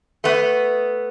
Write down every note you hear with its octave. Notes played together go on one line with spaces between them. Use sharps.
A3 B3